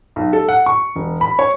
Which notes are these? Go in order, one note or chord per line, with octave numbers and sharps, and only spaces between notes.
B1
A4
F#5
C#6
E1
B5
C#5